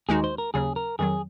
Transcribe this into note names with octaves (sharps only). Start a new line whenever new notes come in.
D#2 D#3 G#3 D#4 F#4 G#4
C5
A#4
D#2 C#3 F#3 C#4 G#4
A#4
F2 D#3 F#3 G#4